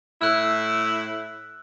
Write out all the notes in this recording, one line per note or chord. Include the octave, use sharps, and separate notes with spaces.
A2 E4 E6 F#6